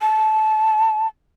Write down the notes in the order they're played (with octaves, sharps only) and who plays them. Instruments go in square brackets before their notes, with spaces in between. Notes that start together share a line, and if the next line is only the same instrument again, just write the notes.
[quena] A5